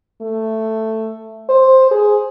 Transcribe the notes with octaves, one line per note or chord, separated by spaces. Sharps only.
A3
C5
G#4